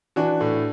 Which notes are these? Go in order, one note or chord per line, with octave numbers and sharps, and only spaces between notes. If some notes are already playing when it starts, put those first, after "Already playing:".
E3 D4 F#4
A2